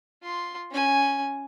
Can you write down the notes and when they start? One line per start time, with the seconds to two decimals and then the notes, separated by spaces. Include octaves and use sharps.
0.22 F4 C6
0.71 C#4 G#5